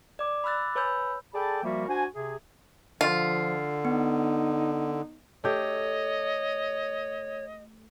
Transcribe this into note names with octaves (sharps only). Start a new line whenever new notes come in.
D5 D6
B5 D6 E6 F#6 A6
B4 C#5 G#5 B5 E6 G6
G#4 A4 D5 G5 A5 B5
F3 G3 A#3 F#4 A#4 E5
D4 F#4 C5 G#5
C3 G#4
D3 F3 F4
B3 D#4
A3 G4 C#5 D#5